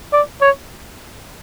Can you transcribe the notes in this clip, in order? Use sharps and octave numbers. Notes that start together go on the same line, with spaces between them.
D5
C#5